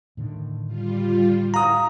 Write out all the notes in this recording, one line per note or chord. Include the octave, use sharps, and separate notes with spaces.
A2 D3 D#3
G3 F4
E4 F5 A#5 D#6